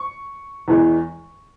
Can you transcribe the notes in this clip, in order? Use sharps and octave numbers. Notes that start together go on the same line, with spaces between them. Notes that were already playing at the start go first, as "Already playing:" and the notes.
Already playing: C#6
E2 E3 G#3